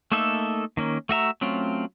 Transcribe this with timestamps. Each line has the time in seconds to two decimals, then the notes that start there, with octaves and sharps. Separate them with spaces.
0.12 A3 A#3 D#4 A4 E5
0.77 D#3 A#3 C#4
1.09 A3 F#4 E5 A#5
1.41 F#3 A3 C4 C#4 F4